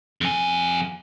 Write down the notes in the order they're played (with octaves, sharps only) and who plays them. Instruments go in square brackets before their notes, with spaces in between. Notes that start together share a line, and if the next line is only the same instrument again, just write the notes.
[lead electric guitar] F2 G#5